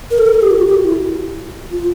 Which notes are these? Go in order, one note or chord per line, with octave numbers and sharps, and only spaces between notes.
A#4
A4
A#4
A4
G4
F4
F#4
G4
F#4
E4
F4